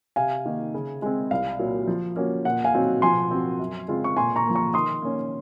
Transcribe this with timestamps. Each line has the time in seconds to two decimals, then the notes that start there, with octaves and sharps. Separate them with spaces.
0.16 C3 F5 G#5
0.45 D#3 A#3 D#4
0.74 C#3
1.02 G#3 C4
1.31 C2 F5
1.59 A#2 F#3
1.87 F3
2.16 A#3 C#4 F#4
2.45 A#2 F#5
2.64 F5 G#5
2.74 F#3 C4 D#4 F#4
3.02 F3 G#5 C6
3.31 C4 F#4
3.59 F#2
3.88 C#3 G#3 C4 F4
4.04 C#6
4.17 A#2 G#5 C6
4.36 A#5 C#6
4.45 F3 A#3
4.55 A#5 C#6
4.74 D#3 C6 D#6
5.02 A#3 C#4